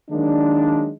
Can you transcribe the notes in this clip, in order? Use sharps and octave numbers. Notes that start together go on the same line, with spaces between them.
D#3 F#3 G#3 A#3 D4